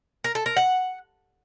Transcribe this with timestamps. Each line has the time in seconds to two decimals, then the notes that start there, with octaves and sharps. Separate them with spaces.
0.24 A#4
0.35 A4
0.46 A#4
0.57 F#5